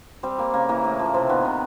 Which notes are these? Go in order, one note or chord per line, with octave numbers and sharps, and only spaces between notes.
G3 C4
G3 A#3
C#3 A#3
E3 A#3
A2
F3
C3 C4
D#3 B3
C3